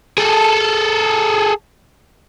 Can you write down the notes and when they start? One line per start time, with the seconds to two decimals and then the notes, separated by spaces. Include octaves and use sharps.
0.18 G#4 A4